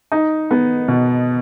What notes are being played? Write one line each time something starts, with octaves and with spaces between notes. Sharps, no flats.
D#4
B3
B2